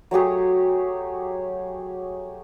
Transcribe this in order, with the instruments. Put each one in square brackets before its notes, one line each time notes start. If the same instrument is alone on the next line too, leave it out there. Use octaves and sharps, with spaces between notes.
[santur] F#3 A3 G4 G#4